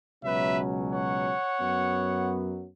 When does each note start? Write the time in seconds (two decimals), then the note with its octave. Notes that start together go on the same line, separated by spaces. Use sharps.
0.23 C#2 B2 F#3 C#4 B4 E5
0.92 C#5 F#5
1.60 F#2 F#3 B3